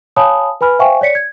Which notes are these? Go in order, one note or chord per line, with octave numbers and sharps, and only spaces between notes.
C#5 F5 G#5 A5 B5 D#6
B4 G#5 B5 F6
C5 E5 F5 G5 G#5 C#6
C#5 D5 B6 C#7
G#6